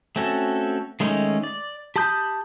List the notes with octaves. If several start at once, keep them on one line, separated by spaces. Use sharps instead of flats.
A3 C4 C#4 F#4 A4
D#3 G#3 A3 C#4 D#4
D5
G4 A5 B5 D#6 G6